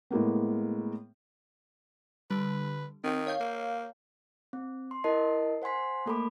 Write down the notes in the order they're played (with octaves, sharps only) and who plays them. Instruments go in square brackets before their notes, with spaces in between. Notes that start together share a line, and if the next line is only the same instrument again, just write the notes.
[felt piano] A2 G#3 A#3 B3
[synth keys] D3 G3 [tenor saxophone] B4
[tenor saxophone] D#3 [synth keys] C4
[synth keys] C#5 F5 G6
[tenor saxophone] A#3
[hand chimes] C4
C6
E4 A#4 D#5 A5 C7
C5 F#5 G#5 C6 B6
A3 A#3 A4 A#4 B5 D6